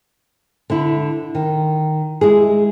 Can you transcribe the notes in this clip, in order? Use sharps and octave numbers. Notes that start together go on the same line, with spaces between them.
D3 E4
D#3
G#3 E4 G#4